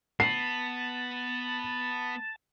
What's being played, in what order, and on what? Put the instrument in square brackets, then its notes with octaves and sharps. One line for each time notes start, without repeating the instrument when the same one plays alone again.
[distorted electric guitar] B3 [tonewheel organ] A5 [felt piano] C7